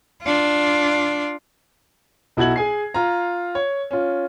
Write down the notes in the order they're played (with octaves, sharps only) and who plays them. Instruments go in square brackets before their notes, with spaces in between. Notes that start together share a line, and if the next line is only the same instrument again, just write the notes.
[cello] D4 F4
[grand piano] B1 E4 F#4 G#6 F#7
G#4 G#5 C7
F4 A#5
C#5
C#4 F4